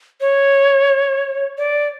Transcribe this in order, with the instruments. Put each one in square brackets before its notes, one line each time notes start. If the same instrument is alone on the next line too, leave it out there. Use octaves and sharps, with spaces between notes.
[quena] C#5
D5